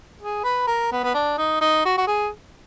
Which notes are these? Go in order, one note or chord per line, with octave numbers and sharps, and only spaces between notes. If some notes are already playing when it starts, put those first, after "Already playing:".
G#4
B4
A#4
B3
B3
D4
D#4
D#4
F#4
F#4
G#4